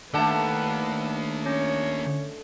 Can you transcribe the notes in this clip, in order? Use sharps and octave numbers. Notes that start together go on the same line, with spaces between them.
D#2 A3 D4 A4 B4 F#5 A5
C#4 C#5